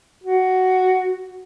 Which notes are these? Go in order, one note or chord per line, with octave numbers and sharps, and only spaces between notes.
F#4